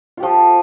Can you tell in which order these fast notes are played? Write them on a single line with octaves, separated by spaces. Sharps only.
F4 G4 F3